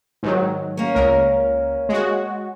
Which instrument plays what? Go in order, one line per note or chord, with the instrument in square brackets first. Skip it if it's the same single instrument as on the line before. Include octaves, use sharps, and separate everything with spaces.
[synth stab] G#2 D#3 F#3
[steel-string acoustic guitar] A#3 C#4
[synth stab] C#2 A#4
G#3 F#4